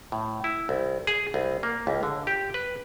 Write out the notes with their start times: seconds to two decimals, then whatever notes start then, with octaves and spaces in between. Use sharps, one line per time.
0.12 A2
0.44 E4
0.69 C2
1.07 G#4
1.34 C2
1.63 A#3
1.87 C#2
2.03 D3
2.27 G4
2.54 B4